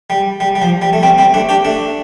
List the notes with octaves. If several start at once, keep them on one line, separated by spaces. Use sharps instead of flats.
G3
G3
G3
F3
G3
A3
G3 C4
G3 C4
A3 D4
D4 G4
A3 D4